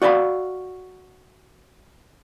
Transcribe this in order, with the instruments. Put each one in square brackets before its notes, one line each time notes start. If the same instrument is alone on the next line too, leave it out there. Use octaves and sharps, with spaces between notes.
[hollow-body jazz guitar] F#4 D5 F5 G5 B5